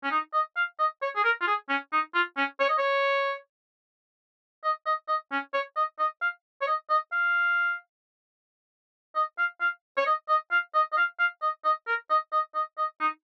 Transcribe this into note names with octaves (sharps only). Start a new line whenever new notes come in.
C#4
D#4
D#5
F5
D#5
C#5
G#4
A#4
F4
G#4
C#4
D#4
F4
C#4
C#5
D#5
C#5
D#5
D#5
D#5
C#4
C#5
D#5
D#5
F5
C#5
D#5
D#5
F5
D#5
F5
F5
C#5
D#5
D#5
F5
D#5
D#5
F5
F5
D#5
D#5
A#4
D#5
D#5
D#5
D#5
D#4